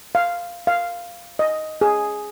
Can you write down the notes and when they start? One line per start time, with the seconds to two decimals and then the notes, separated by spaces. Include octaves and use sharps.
0.15 F5
0.67 F5
1.39 D#5
1.81 G#4